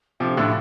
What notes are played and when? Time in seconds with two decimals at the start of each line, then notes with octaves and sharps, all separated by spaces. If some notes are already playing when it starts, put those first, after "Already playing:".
0.20 C3 F3 D4 A4 F5 C6
0.37 A2 D3